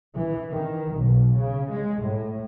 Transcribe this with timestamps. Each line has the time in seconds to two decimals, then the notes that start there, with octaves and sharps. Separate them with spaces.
0.14 E3
0.51 D#3
0.96 B1
1.36 C#3
1.71 G#3
2.02 A2